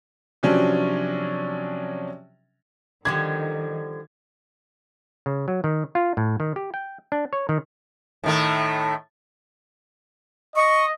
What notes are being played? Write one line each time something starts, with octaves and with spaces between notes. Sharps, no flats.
C3 F3 F#3 C#4 D4
D3 D#3 F3 G3 G#6
C#3
F#3
D#3
F4
A2
D#3
G4
G5
D4
C#5
D#3
A2 D#3 A3
D#5 C#6